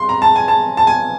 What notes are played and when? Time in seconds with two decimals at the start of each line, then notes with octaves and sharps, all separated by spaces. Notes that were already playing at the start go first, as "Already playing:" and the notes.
Already playing: G2 C6
0.09 A#5
0.22 A5
0.36 G#5
0.48 A5
0.77 A5
0.87 G#5